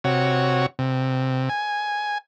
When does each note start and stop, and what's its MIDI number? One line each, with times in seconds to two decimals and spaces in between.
0.04 0.66 48
0.04 0.66 66
0.04 0.66 73
0.79 1.49 48
1.49 2.18 80